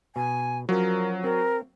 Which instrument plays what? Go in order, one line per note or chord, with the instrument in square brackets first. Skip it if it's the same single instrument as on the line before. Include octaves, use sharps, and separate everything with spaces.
[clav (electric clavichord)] B2 [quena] G#5
[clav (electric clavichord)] F3 C#4 [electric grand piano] F#3 [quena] A#4
[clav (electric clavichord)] C4 [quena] A#4